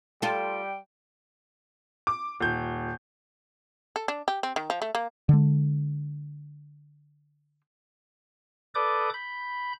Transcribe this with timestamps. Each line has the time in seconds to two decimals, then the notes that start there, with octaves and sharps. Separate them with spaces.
0.22 G3 F4 A4 G5
2.07 D6
2.40 D#1 G6
3.96 A4
4.08 D4
4.28 G4
4.43 C4
4.56 D#3
4.70 F3
4.82 A3
4.95 A#3
5.29 D3 G#3
8.75 A4 B4 D5 D6 D#6 G6
9.14 B5 G6